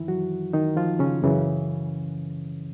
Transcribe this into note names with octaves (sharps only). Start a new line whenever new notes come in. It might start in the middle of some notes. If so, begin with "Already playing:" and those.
Already playing: F#2 D#3 E3 E4
F#3 F#4
D#3 D#4
F3 F4
C#3 C#4
F#2 C#3 E3